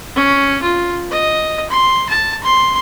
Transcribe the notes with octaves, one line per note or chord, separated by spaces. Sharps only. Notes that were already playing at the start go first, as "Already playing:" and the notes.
C#4
F4
D#5
C6
A5
C6